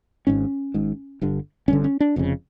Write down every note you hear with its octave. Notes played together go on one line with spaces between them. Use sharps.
G#1 G#2 C#4
G#1 G#2
G1 G2 D3
G1 G2 D3 C#4
C#4
D4
F1 F2 C#3